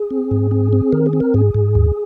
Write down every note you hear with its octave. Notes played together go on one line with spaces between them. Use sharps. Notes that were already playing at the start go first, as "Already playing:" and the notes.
Already playing: G#4
C4
G#2
C4
C4
D#3 A#4
G#4
C4
A#4
G#2 G#4
G#2
D#2